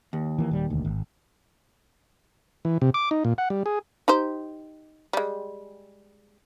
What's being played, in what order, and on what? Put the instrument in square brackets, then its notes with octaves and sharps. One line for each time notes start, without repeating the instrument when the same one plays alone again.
[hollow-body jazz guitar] D#2
[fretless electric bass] E3 A#3
D#1 G3
E1 D2
G#1
[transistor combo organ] E3
C3
D6
D#4
A#2
F#5
G3
G#4
[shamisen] D#4 G4 C5
G3 G#3